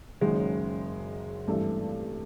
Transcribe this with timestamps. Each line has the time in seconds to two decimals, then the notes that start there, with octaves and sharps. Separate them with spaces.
0.21 F#1 F#2 D#3 F#3 G#3
1.47 G#1 G2 E3 A3